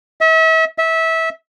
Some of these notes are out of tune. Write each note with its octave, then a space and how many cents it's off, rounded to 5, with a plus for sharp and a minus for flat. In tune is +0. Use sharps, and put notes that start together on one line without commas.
E5 -35
E5 -20